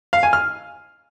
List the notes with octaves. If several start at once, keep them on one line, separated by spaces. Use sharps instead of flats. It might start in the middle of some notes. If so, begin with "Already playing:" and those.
F5
G#5
F6